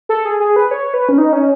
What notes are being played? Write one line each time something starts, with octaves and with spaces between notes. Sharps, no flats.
A4
G#4
G#4
B4
C#5
B4
C#4
D#4
C#4